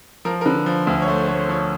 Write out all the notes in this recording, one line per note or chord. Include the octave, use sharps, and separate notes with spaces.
F3 A#4
A#4
D3 B4
F3
D2
C#5
A3 C5
A3 C#5
C5
F3 C#5